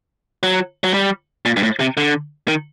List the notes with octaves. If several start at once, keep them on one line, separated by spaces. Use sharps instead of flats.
F#3
F#3
G3
A#2
G2
A2
C3
D3
D#3